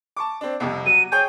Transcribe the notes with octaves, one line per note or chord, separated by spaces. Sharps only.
A5 C#6 D6
C4 D4
C2 F2 C3
F#3 D#7
G#4 C#5 G5 G6